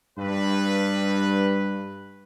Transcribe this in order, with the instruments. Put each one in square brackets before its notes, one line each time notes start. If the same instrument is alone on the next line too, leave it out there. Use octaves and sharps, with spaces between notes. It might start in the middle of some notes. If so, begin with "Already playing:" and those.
[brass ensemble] G2 B4